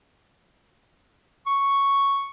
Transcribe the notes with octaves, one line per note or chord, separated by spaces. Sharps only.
C#6